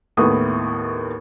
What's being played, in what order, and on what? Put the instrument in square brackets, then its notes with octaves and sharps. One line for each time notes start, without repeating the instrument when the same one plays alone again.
[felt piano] D#2 A2 B3 E4 D#6